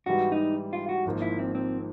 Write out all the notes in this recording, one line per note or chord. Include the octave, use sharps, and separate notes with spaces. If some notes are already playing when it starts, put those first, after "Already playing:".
G#2 E3 G3 F#4
D#4
F4
F#4
G#1 G#2 F3 A#3
E4
C4
C4